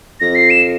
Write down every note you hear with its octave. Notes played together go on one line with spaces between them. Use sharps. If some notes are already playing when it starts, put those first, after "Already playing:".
F2 A#6
C7
E7